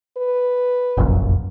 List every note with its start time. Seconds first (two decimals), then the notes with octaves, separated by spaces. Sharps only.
0.17 B4
0.97 F1 A#1 F#2